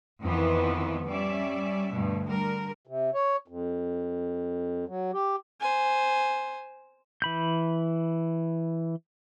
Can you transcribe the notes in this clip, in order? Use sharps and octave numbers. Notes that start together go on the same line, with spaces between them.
F2 D#3 E3 B3
G3 C#4 D5 E5
D2 G2 B2
D3 G3 A#4
C3
C#5
F2
F#3
G4
C5 G#5
E3 B5 G6